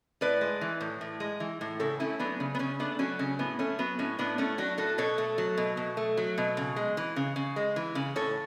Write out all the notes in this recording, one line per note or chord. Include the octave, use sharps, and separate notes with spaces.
A2 B4 D5
G#3
E3
A2
A2
G#3
E3
A2
C#3 A4 C#5
A3 C#4 E4
F#3 B3 D4
C#3
B3
C#3 C#4
A3 B3 D4
F#3 C#4
C#3 C#4
A2 B3
A3 C#4
F#3 B3
A2 C#4
A2 B3 D4
A3 C#4 E4
F#3 D4 F#4
A2 F#4 A4
B2 A4 C#5
A3
F#3
B2
B2
A3
F#3
B2
C#3
G#3
E3
C#3
C#3
G#3
E3
C#3
A2 A4 C#5